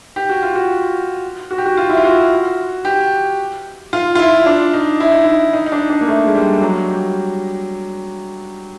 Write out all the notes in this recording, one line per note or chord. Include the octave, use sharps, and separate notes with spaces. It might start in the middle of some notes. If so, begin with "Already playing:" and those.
G4
F#4
F4
F#4
F#4
G4
F#4
F4
E4
F4
F#4
G4
F4
F4
E4
D4
D#4
E4
D#4
E4
D#4
D#4
D4
D4
A#3
A3
G#3
G3
F#3
G3